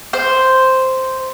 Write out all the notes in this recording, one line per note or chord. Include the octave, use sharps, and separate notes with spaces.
C5